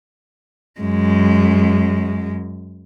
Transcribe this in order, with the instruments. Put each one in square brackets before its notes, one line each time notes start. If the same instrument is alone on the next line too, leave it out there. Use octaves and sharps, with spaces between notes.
[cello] F#2 G#3